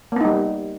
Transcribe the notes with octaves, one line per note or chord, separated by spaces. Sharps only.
G3 A#3 B3 D#4